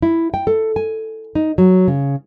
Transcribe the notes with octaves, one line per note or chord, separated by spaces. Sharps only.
E4
G5
A4
G#5
D#4
F#3
C#3